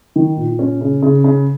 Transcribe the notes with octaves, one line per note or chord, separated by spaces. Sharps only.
D#3
A#2
C#4
C#3
C#3
C#3